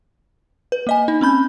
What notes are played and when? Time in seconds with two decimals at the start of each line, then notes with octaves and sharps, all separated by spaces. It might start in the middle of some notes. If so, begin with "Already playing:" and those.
0.72 B4
0.87 A#3 D#5 G#5
1.08 D#4
1.21 C4 C#4 B5 G6